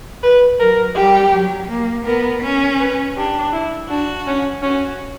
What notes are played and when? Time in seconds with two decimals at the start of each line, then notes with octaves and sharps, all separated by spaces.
0.23 B4
0.59 F#3 A#4
0.95 G3 G4
1.33 F#3
1.69 A#3
2.05 B3 A#4
2.43 C#4
2.79 B4
3.16 D4 G4
3.53 E4
3.89 D4 F#4
4.27 C#4
4.63 C#4 F#4